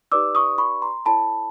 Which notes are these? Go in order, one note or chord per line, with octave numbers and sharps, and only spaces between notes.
D#4 G4 B4 D5 D6 E6
C#6 D#6
B5 C#6
A#5 C6
E4 A4 C#5 A5 B5